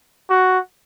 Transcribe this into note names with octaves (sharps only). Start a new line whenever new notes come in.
F#4